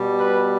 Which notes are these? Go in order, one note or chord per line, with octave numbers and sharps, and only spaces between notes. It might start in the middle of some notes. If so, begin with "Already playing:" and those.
Already playing: B2 G3
B4